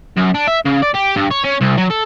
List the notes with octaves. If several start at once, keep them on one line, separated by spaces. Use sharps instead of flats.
F#2
D4
E5
C#3
D5
G4
G2
C#5
C#4
C2
F#3
A4